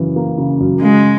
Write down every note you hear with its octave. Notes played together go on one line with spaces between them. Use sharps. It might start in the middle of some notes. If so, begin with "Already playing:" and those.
Already playing: F#2 C#3 E3
A#3
C#3
F#2
C#3 G#3